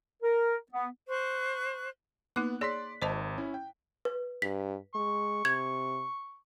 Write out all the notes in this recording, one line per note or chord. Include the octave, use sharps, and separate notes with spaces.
A#4
B3
C5 C#6 F#6
A#3 B3 D#4 D6 F#6
G#4 C#5 D5 C6 B6
G#1 C5 D#5 A5
C#4 E4
G5
B4
G2 B6
G#3 C#6
C3 G#6